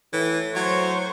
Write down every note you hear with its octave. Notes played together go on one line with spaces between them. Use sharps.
A2 E3
F#3 C5 C#6